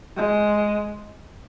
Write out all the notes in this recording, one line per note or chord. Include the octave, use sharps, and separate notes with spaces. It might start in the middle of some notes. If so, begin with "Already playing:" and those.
G#3